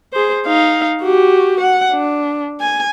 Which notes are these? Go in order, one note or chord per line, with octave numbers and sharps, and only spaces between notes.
G#4 C5
D#4 F5
F#4 G4
F#5
D4
G#5